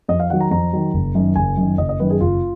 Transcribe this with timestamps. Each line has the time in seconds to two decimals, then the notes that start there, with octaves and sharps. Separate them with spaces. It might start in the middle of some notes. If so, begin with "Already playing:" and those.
0.08 F2 D#5
0.20 F5
0.30 D#3 F#3 F#5
0.41 A#5
0.51 F2 A#5
0.73 D#3 F#3
0.94 F#1
1.15 F#2 D#3
1.36 F#1 G#5
1.57 F#2 D#3
1.78 F#1 D#5
1.89 D#5
2.00 F#2 D#3 B4
2.10 G#4
2.21 F#1 F4